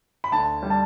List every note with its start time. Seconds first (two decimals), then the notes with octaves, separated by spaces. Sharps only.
0.24 B5
0.32 D2 A5
0.63 G3
0.70 A5